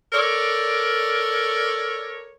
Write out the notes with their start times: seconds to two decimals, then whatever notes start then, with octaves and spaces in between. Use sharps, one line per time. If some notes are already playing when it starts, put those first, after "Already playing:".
0.13 A4 A#4 C#5 D5